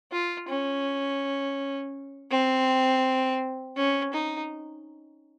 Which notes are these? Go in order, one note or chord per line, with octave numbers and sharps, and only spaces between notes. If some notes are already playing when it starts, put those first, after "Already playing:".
F4
C#4
C4
C#4
D#4